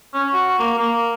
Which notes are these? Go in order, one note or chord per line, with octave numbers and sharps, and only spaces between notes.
C#4
F#4
A#3
A#3